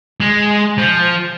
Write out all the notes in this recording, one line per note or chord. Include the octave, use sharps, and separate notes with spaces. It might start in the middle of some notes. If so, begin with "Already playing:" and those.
G#3
F3